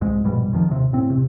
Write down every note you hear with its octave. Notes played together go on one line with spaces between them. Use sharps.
C2 G#2 G#3
A#1 G2 B2 G3
F1 F2 D#3 F3
D#2 C3
A2 C4
E1 C3